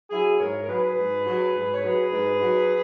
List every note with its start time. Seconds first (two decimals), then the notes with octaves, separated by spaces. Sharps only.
0.10 F#3 E4 G#4
0.39 G#2 A#4 C#5
0.62 A#4
0.68 F#3 G#4 B4
0.97 G#2
1.26 F#3
1.55 G#2
1.73 C#5
1.84 F#3 G#4 B4
2.12 G#2
2.41 F#3